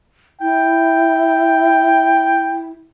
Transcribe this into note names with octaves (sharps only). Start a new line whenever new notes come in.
E4 G5